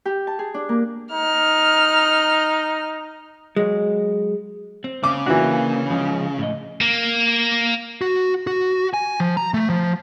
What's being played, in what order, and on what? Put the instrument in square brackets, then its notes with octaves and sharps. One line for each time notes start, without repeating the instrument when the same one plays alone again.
[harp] G4
A5
G#4
D4
A#3
[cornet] D#4 [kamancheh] F6
[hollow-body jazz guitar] F#3 G#3
[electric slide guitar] C4
[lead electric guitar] C#3 [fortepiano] D6
[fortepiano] E3 F#4 [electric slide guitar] A#3 D4
[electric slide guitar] F3 G#3 C#4
A2 D#5
[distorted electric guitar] A#3
[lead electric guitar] F#4
F#4
G#5
F3
A#5
A3
F3